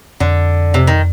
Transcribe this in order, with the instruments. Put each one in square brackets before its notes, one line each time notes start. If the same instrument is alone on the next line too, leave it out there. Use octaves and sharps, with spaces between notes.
[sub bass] F2 [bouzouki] D3
[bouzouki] C3
D#3